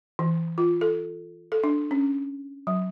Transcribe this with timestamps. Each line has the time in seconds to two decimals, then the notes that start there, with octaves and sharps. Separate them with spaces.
0.19 E3
0.58 F4
0.81 A4
1.52 A4
1.64 D4
1.91 C#4
2.67 F#3